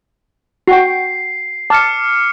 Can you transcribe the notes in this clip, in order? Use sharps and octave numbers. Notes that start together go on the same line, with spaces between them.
F#4 G5 C7
A5 D6 F6 C#7